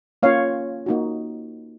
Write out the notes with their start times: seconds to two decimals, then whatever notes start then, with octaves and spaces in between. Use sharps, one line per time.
0.23 A#3 C#4 F4 C#5 F5
0.86 A#3 D#4 F#4